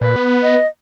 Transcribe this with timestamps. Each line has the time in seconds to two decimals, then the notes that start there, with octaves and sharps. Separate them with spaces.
0.01 A#2 B4
0.16 B3
0.43 D#5